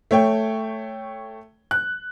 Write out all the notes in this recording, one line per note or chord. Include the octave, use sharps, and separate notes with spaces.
A3 C#5 G5
F#6